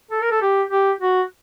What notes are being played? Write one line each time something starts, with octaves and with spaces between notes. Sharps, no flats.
A4
A#4
A4
G4
G4
F#4